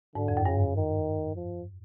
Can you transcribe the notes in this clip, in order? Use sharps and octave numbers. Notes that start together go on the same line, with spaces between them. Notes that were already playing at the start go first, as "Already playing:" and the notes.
G#2 D3
F2
F#2
G2 C#3
D#3
F3